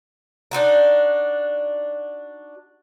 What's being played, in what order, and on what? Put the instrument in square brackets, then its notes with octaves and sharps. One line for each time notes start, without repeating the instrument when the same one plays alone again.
[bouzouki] D4 D#4 F#4 A#4